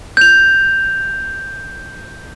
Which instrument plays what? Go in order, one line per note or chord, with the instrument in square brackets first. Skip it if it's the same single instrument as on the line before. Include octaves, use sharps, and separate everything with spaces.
[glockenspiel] G6 F7